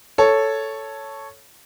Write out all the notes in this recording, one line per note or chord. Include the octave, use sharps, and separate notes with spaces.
A4 C#5